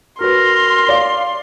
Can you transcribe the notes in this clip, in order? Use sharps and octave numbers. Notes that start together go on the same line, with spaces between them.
F#4 A#4 B4 C6
D5 F5